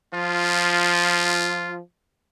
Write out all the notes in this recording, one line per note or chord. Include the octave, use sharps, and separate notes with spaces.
F3 F4